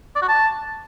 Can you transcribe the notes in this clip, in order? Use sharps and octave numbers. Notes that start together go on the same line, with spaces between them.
D5
F#4
A5